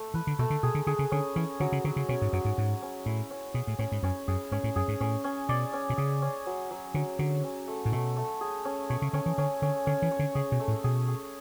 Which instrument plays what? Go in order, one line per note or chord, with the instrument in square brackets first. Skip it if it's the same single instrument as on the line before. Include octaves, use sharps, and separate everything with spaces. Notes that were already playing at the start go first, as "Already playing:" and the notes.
Already playing: [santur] A3
[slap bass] E3 [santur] B4
[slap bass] D3
[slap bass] B2 [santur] A3
[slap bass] D3
[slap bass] B2 [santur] G#4
[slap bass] D3
[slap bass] D3 [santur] G#4
[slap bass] C#3
[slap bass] D3 [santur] C#4
[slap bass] E3 [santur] C#4
[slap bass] D3 [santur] F#3
[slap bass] C#3
[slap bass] D3 [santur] F#3
[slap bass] C#3
[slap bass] B2 [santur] C#4
[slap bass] G#2
[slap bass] F#2 [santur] F#3
[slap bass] G#2
[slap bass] G#2 [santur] C#4
[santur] C#4
[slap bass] A2 [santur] E4
[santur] C#4
[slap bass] B2 [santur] G#4
[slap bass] A2
[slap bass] A2 [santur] C#4
[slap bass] G#2
[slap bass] F#2 [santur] C#4
[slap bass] F#2 [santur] G#4
[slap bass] G#2 [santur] C#4
[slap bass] A2
[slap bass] F#2 [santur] G#4
[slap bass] G#2
[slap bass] A2 [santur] C#4
[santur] C#4
[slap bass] B2 [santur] D5
[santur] C#4
[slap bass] B2
[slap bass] C#3 [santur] G#4
[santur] C#4
F#3
F#3
[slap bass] D3 [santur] F#3
[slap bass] D3 [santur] F#3
[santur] C#4
A3
[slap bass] A2
[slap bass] B2 [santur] A3
[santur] A3
G#4
C#4
[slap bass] B2 [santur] C#5
[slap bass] C#3
[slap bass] D3 [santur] C#4
[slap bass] E3
[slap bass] D3 [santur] C#4
[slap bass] D3 [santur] C#4
[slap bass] D3 [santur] C#4
[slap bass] E3
[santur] C#5
[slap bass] D3
[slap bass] C#3 [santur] G#4
[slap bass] B2
[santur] A3
[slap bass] A2
[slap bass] B2 [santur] G#4
[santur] G#4